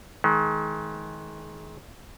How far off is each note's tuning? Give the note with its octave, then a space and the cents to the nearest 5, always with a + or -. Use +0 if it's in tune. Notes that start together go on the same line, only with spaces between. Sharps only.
D#3 +35 G#3 +35